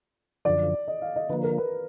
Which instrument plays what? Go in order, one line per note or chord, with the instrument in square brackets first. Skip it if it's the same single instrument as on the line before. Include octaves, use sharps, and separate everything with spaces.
[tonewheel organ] F#2 D3 F3 [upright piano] D5
[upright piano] D#5
F5
D#5
[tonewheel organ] D3 F3 A#3 [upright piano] B4
[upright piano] A#4
B4